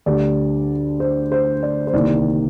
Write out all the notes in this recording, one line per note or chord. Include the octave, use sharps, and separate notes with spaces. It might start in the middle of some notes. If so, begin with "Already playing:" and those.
D2 D3 G3 D5
C5
C5
D5
C5
C2 C3 D#3 A#3 D5